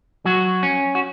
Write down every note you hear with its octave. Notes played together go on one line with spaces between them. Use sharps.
F#3 F#4
C#4
F#4